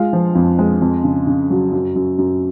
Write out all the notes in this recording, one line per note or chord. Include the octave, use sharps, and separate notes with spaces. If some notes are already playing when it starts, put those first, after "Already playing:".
Already playing: G#3 F4 F5
F3
F2
G#3
F2
C#3
C#3
F#3
F#2
F#2
F#2